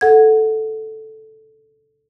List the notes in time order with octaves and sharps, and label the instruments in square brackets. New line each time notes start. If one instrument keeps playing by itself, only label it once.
[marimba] A4 F#5 G#6